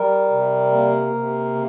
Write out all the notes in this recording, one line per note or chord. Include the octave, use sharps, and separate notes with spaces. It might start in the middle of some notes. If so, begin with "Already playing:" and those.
Already playing: G3 A#4
C3
A#3
C3
C#3